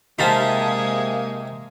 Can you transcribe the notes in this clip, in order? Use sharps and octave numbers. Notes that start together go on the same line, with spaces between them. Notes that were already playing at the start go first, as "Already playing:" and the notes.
C3 G#3 A#3 D#4 G#4 F5 A5 B6